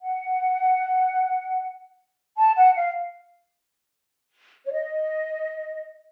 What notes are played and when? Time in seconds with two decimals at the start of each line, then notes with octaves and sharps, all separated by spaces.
0.01 F#5
2.37 A5
2.57 F#5
2.76 F5
4.66 C#5
4.72 D#5